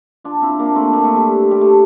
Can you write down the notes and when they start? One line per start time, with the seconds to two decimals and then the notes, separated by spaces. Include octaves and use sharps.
0.24 D4 F4
0.42 C4 E4
0.59 A#3 D4
0.75 A3 C4
0.93 A#3 D4
1.04 A3
1.16 G3
1.51 G3
1.61 A3